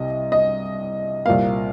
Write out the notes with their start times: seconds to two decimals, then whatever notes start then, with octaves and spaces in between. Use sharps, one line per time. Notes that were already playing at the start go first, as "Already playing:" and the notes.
Already playing: C2 C3 D#5
0.32 D#5
1.26 C2 A#2 A#3 F5